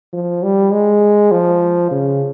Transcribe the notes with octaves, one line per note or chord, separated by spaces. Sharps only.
F3
G3
G#3
F3
C#3